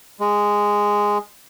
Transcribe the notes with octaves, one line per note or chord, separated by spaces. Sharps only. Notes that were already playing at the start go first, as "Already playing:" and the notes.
G#3